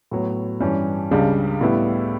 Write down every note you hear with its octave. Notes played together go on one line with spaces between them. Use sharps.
A2 F#3 B3
G2 E3 G3 C#4
C#2 C#3 G3 D4
A2 G3 B3 E4